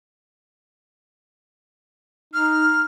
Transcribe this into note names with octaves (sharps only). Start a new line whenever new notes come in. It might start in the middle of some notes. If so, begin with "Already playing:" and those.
D#4 F6